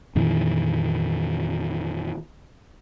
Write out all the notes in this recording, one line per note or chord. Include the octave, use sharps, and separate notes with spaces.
F2 A#2 D#3 E3